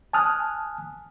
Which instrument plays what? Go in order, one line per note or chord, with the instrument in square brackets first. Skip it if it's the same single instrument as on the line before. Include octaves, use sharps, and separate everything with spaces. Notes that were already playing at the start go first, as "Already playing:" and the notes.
[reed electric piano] G#5 A5 D#6 F6 F#6